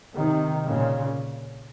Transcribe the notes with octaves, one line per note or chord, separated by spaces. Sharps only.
C3 D#3
A#2 C#3